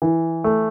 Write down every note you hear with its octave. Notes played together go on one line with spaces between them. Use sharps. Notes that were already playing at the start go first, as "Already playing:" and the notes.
E3
A3